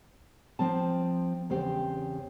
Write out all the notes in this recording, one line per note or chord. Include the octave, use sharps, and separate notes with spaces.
F3 C4 A5
E2 C#3 C4 G4 C5 G5